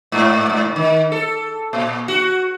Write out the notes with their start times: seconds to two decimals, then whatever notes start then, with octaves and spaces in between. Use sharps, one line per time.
0.12 G#2
0.50 G#2
0.76 D#3
1.12 A4
1.73 A#2
2.08 F#4